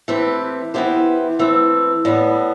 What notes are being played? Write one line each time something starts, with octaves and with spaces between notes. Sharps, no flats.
E3 A3 C4 G4 B4
E3 B3 E4 G4 C5
E3 A3 C4
A2 G3 B3